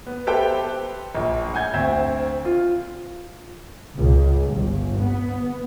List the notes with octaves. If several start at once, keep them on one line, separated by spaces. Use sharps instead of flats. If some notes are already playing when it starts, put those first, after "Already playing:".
B3
G4 A4 B4 C5 E5 G5
A#1
F#5 G#5 G6 G#6
D2 C4 E5
F4
C#2
G1
B3